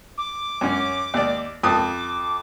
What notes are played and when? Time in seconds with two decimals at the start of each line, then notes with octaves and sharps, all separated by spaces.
0.18 D6
0.61 F#2 C#4
1.14 D#2 D5
1.63 F2 A5 D6 D#6